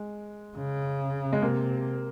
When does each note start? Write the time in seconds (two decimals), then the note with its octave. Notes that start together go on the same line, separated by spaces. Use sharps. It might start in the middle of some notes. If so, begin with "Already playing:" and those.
Already playing: G#3
0.57 C#3
1.33 G#3
1.42 C3 A#3